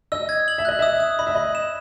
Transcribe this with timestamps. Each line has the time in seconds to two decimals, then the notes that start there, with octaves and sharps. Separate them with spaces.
0.12 D#5 E6
0.29 G#6
0.48 F#7
0.58 E5
0.65 D#5 F#6
0.79 E5 D#6
1.00 D#6
1.19 D#5 B5
1.27 E5
1.35 D#5 B5
1.55 E7